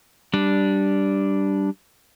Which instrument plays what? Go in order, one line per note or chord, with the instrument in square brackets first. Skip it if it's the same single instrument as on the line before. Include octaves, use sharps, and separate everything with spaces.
[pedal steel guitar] G3 D4